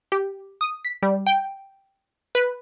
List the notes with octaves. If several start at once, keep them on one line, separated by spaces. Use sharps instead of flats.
G4
D#6
B6
G3
G5
B4